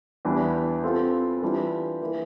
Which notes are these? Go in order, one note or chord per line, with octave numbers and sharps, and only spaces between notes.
E2 E3 G3 D4
G3 C4 F4 A4
E3 G3 D4 F4
E3 A#3